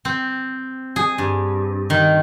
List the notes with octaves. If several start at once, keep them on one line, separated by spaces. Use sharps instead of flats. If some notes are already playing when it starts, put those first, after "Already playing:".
C4
G#4
G2
D#3